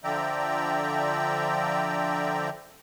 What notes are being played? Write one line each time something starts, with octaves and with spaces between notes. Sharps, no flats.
D3 F3 D5 E5 G5 A#5